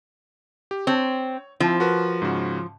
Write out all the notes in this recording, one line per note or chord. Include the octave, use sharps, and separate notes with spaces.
G4
C4 C#5
F3 C4 E4
F#4 A#4 B4
G#2 C#3 F#4